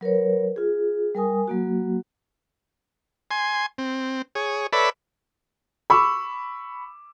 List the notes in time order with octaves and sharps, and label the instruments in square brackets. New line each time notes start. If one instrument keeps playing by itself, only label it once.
[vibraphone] F#3 A#4 B4 C#5
F4 G#4
G3 A#4 G#5 D#6
F#3 A#3 F#4
[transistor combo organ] G#5 C6
C4
G#4 C#5
A4 B4 C#5 D5 E5 B5
[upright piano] B5 C#6 D6 E6